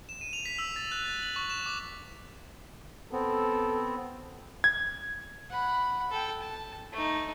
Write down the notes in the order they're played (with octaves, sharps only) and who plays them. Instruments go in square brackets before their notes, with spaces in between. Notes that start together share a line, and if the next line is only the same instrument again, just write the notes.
[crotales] E7
D#7
F7
B6
E6
A6
F#6
A6
F#7
C#6
E7
D6
[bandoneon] B3 C4 [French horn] A4
[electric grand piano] G#6
[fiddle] F#5 B5
A4 G5
A5
A3 D#4